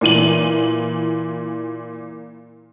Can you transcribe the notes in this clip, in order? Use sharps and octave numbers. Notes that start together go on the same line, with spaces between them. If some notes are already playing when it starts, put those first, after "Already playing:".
A#2 E3 D#7 F#7